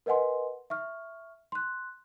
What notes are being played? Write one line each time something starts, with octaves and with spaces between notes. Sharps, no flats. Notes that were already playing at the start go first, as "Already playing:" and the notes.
A#4 B4 D#5 F#5 G#5 C6
E5 C#6 F6
C6 F#6